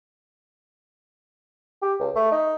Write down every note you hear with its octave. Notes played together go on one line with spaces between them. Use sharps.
G4
C#2
A3
D#4